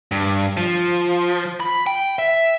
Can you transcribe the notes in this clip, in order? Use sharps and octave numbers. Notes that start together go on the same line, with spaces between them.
G2
F3
B5
G5
E5